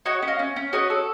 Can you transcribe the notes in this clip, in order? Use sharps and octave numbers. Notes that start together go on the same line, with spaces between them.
F#4 C#5 D#5
C#4
D#5 F5
C#4
C#4
F#4 C#5 D#5
A4